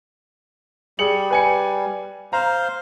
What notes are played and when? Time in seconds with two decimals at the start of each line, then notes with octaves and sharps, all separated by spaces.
0.99 G3 G#4 C#7 F#7
1.30 B4 G#5 C#7
2.33 C5 F5 A#5